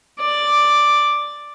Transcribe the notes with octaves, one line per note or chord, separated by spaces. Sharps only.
D5